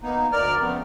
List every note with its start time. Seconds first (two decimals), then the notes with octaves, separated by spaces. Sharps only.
0.01 A#3 B3 D#4
0.32 D2 A#4 D5 F6
0.60 C#3 F3 A3 B3 C4